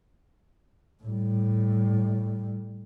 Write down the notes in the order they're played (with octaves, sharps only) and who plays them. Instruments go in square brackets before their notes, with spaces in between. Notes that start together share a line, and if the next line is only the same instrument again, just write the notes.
[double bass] A2 G3